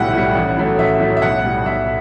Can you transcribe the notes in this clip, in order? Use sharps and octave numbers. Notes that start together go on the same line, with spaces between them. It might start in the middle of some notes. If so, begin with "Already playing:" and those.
Already playing: B1 A2 G3 E5 F#5 G5
A2 G3
A1
A2 F#3 A3
A1 E5
A2 F#3 A3
E5
B1 F#5
A2 G3
B1 E5